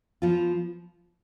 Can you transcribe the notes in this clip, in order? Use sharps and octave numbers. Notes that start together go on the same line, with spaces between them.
F3 B3 F4